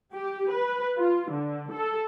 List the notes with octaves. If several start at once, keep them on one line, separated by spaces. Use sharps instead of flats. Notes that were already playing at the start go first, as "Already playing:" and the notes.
G4
B4
F4
D3
A4